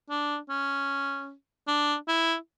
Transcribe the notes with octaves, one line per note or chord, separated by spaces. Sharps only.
D4
C#4
D4
E4